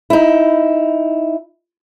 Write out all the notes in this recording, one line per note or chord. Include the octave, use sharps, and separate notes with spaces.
D#4 E4